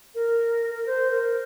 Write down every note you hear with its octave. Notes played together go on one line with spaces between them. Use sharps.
A#4
A#4
C5
A#4